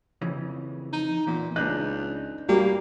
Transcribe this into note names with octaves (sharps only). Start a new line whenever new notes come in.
F2 C#3 E3
D#4
E2 A#2
C#2 D4 D#4 F#6 G6
G3 A#3 F#4 G4